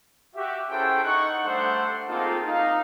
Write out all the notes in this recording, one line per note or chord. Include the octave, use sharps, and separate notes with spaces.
F#4 G4 E5
C#4 E4 G#4 A4 C5 G5
D#4 F#5 C#6
G3 A3 D4 A4 C5 F#5
A#3 C4 D#4 F4 G#4 A4
A#3 D#4 F5